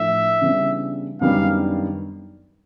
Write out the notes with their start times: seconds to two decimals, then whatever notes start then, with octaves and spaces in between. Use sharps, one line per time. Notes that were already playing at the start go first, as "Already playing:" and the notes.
Already playing: A2 F3 A3 D4 E5
0.41 C#3 E3 G3 B3 D4
1.21 F#2 D#3 G3 B3 D4 F5